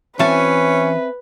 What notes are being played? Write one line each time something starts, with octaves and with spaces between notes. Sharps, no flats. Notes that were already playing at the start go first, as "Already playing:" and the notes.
E3 C4 C#4 F#4 B4 E5 G#5 A5